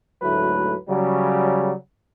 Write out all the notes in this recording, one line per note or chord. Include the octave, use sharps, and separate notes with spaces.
D2 G#2 F#3 A3 E4 B4
C#3 F#3 G3